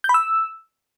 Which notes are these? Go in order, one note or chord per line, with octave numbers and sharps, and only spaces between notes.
G6
B5
E6